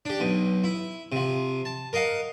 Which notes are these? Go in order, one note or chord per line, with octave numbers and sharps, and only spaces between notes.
D4 G4
B1 B2
E4
C3 F3
A5
A#4 D#5 F5 F#5